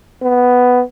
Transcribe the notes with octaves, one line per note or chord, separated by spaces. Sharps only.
B3